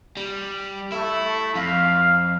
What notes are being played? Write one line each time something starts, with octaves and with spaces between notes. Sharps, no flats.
G3
A3 E4
F2 F5